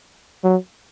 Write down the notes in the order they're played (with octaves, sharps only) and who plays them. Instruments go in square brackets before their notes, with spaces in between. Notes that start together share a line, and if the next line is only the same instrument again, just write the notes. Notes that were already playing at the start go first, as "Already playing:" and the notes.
[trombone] F#3